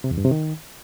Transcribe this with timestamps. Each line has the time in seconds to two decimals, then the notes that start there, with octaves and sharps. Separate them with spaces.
0.04 C3
0.11 E2
0.18 G2
0.24 C3
0.31 D#3